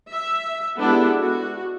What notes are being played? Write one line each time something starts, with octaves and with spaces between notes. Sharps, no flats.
E5
G#3 B3 D4 E4 G4 A4
F#4